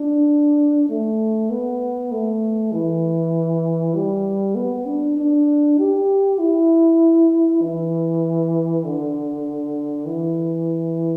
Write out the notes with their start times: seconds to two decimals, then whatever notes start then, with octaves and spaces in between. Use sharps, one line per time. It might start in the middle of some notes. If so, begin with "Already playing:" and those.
Already playing: D4
0.89 A3
1.50 B3
2.12 A3
2.72 E3
3.94 G3
4.55 B3
4.86 D4
5.17 D4
5.78 G4
6.39 E4
7.62 E3
8.84 D3
10.06 E3